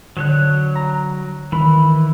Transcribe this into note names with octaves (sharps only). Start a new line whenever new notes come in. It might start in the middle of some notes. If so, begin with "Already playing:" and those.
D3 F#3 C#5 F#6
A#5
D#3 E3 B5